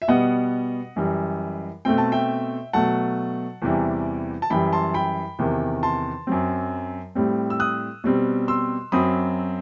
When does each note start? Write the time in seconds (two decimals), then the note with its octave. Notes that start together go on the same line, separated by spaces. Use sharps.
0.02 E5
0.08 B2 G3 B3 D#5 F#5
0.96 F#2 E3 G3
1.85 B2 A3 C4 G5
1.98 A5
2.12 E5 G5
2.73 B2 F#3 A3 F#5 A5
3.62 E2 C3 E3 G3
4.42 A5
4.50 F#2 E3 G3 G5 B5
4.73 A5 C6
4.94 G5 B5
5.39 E2 C3 D#3
5.83 A5 C6
6.27 F#2 F#3 C4
7.15 A2 G3 C4
7.50 E6
7.60 D#6 F#6
8.04 B2 G3 C4
8.48 C6 E6
8.92 F#2 F#3 C4 B5 D#6